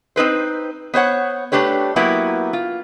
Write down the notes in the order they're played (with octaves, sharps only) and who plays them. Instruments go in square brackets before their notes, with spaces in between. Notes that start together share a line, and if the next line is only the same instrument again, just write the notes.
[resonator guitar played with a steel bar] C4 D#4 B4 C5
B3 C5 C#5 F#5
A3 D4 G4 B4 C#5
F#3 A#3 B3 E4 F#4 G4
F4